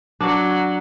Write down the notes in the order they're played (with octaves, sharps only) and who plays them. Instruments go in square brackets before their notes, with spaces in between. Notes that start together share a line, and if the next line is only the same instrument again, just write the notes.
[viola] F#3 [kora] D4 F#4